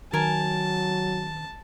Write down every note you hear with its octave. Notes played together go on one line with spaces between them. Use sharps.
D#3 F#3 A#4 G#5 A5